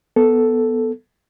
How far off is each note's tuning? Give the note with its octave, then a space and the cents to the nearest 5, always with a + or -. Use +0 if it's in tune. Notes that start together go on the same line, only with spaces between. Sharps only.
B3 +0 A4 +0